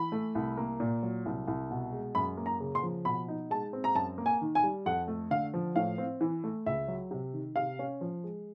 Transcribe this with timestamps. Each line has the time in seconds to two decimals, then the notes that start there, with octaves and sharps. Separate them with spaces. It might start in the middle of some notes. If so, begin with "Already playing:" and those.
Already playing: E3 B5
0.12 A3
0.35 C2
0.57 A#3
0.80 A#2
1.03 F#3
1.26 C2
1.48 C2
1.71 B2
1.92 G#3
2.15 F#2 B5
2.37 A#3
2.46 A#5
2.60 C#3
2.75 C6
2.83 F3
3.05 B2 B5
3.28 D#4
3.50 G#3 A5
3.73 C4
3.84 A#5
3.95 F#2 A5
4.18 A#3
4.26 G#5
4.41 D#3
4.55 G#5
4.63 G3
4.86 F2 F#5
5.08 A3
5.30 D3 F5
5.54 F3
5.76 A2 F5
5.98 C4
6.21 E3
6.44 A3
6.66 C#2 E5
6.88 F#3
7.11 C3
7.33 D#3
7.56 C3 F5
7.79 C#4
8.01 F3
8.24 G#3